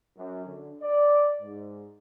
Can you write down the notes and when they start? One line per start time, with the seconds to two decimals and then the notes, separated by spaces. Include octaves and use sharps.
0.17 F#2
0.46 D3
0.82 D5
1.41 G#2